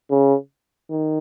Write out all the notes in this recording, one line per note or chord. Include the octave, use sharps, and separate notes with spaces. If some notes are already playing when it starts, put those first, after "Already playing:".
C#3
D#3